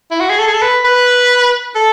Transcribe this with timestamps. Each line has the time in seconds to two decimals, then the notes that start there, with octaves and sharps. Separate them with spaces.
0.11 E4
0.20 F#4
0.30 G#4
0.39 A4
0.47 G#4
0.54 A4
0.62 B4
0.85 B4
1.75 A4